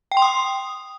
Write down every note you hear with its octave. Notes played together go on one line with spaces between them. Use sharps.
G5
C6
D#6